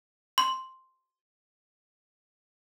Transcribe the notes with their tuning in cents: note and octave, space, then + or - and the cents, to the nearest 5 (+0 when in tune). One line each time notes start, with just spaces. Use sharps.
C6 +0